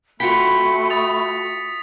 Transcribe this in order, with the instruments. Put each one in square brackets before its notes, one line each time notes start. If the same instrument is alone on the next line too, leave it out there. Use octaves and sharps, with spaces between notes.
[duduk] A3 [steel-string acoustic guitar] F4 F#4 G5 [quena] B5 [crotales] B6 C#7
[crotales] D#6 A6 F7